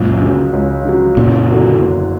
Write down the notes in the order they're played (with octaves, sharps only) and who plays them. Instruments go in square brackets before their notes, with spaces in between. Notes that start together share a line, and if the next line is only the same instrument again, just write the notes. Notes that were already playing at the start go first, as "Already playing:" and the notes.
Already playing: [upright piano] C#2 [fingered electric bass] F#2 A#2
[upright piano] C#3 F#3
C#2
C#3 F#3
[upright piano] F#1 [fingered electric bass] A#2 C#3
[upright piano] E2 D3 F#3 A#3
F#1